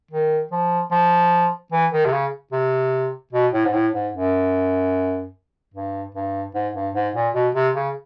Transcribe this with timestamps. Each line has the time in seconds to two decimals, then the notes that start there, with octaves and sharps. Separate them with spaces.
0.11 D#3
0.51 F3
0.91 F3
1.72 E3
1.92 D#3
2.05 C3
2.12 C#3
2.52 C3
3.33 B2
3.53 A2
3.65 G#2
3.73 A2
3.93 G#2
4.13 F#2
5.74 G2
6.15 G2
6.55 G#2
6.75 G2
6.95 G#2
7.15 A#2
7.34 B2
7.55 C3
7.75 C#3